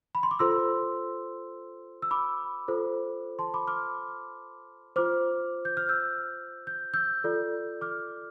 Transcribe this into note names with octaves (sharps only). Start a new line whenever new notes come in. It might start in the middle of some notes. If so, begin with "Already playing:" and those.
B5
C6
D6
F4 A4 C5 C6 E6
E6
B5 D6
F4 A4 C5
A5 C6
B5 D6
D6 F6
F4 C5 D6 F6
G6
F6
E6 G6
G6
E6 G6
F4 A4 D5
D6 F6